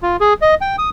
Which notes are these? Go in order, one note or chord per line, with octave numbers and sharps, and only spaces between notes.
F4
G#4
D#5
G5
D#6